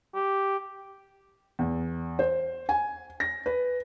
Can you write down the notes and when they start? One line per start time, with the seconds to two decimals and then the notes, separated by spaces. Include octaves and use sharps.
0.15 G4
1.59 E2
2.19 C5
2.69 G#5
3.20 A#6
3.46 B4